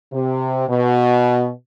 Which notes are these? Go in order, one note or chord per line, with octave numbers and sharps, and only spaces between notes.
C3
B2